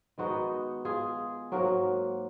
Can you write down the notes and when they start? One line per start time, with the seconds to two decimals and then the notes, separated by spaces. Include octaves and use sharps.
0.18 D#3 G#3 B3 D#4 F#4
0.85 F4 G#4
1.52 G#2 F#3 A#3 F#4 A#4